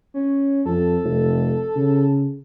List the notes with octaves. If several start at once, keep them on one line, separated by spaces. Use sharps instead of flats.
C#4
F2 A4
F1
C#3